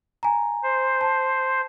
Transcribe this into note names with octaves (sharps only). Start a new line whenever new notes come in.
G#5 A#5
C5
A5